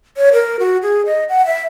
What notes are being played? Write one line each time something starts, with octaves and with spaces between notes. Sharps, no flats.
C#5
A#4
F#4
G#4
D#5
F#5
E5